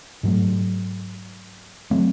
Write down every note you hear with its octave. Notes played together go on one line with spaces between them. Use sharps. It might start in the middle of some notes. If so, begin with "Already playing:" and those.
G#2 F#3 A3
F#3 A3 C4